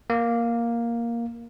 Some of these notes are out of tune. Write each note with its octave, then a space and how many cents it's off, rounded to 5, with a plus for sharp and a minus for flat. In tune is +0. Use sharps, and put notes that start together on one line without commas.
A#3 +5